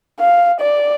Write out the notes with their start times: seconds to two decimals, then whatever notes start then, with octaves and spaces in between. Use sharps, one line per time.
0.20 F5
0.61 D5